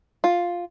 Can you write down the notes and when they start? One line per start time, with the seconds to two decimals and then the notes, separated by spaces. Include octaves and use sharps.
0.24 F4